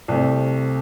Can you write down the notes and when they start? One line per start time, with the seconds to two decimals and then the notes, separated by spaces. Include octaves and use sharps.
0.08 C2 C3 A3